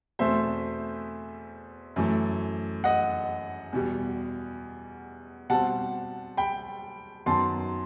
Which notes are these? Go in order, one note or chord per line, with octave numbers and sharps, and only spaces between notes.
E2 B2 A3 C4 C5 E5
F#2 E3 A3
D#5 F#5
E2 B2 G3
B2 G3 C4 F#5 A5
G5 B5
F#2 D#3 F#3 B3 A5 C6